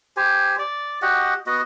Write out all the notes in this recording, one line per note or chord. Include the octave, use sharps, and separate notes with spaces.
G4 C5 G#5
D5
F#4 G4 D#5 F#5
B3 F#4 D#5